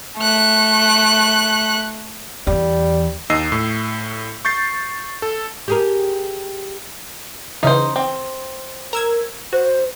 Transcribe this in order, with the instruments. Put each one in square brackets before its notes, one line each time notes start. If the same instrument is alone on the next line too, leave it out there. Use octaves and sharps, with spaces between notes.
[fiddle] A3 F#6
[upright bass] E2 [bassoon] G3
[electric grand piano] D#2 D#4 D#5 E6 C7
A2
C#6 G6 A6 C7
A4
[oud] G4 G#4 A#4
[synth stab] C#3 E3 [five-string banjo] D#4 C5
[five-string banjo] C4
[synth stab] A#4 E6 G#6
[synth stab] F#4 [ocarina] C5